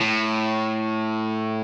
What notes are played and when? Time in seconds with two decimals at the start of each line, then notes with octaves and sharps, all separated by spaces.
0.01 A2